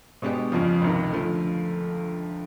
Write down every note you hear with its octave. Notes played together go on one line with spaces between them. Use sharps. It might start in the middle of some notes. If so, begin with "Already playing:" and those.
B2 G#3 B3 D4 G4
F2 C#3 F3
C#2 C3 D#3
D3 F3 A3